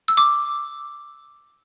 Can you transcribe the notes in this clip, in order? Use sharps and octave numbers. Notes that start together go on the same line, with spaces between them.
E6
D6